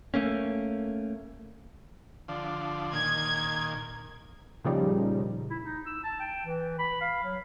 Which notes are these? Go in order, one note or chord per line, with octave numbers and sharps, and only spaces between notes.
A3 A#3 C#4
D3 F3
A#2 D#3 G#6
A#2 C#3 F3 G3 D#4
E4
D#4
E6
A5
G5
E3
B5
F5
F#3